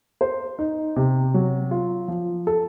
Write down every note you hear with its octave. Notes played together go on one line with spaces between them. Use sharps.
C5
D#4
C3
F#3
F4
F3
A4